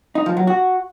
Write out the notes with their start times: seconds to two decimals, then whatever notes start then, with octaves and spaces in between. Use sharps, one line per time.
0.15 D#4
0.26 F3
0.37 F#3
0.47 F#4